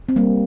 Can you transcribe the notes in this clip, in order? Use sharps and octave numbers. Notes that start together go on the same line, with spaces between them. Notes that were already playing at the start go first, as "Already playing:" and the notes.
C4
G3 A#3